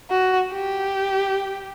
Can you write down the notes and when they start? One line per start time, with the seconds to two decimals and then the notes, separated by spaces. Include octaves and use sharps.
0.10 F#4
0.52 G4